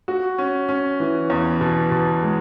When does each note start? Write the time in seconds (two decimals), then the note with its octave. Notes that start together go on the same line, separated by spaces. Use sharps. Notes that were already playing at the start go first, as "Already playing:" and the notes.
0.08 F#4
0.38 C#4
0.69 C#4
1.00 E3
1.30 E2
1.61 B2
1.91 B2
2.22 G#3